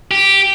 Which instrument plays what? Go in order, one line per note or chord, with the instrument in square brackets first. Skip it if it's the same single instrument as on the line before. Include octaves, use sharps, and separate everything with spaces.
[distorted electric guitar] G4